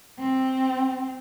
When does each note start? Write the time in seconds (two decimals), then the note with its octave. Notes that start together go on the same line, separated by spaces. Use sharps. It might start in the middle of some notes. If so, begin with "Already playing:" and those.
0.19 C4